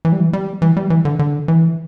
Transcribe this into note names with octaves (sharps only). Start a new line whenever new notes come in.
E3
G3
E3
G3
E3
G3
E3
D3
D3
E3